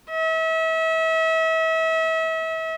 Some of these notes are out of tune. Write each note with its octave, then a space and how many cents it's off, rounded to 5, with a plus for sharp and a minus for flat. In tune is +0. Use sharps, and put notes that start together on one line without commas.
E5 -35